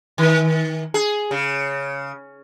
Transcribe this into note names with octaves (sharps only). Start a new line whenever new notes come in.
D#3
G#4
C#3